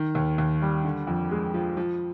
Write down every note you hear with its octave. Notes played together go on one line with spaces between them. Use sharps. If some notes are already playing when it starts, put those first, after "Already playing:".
Already playing: D#3
D#2
D#2
G3
D3
F2
G#3
F3
F3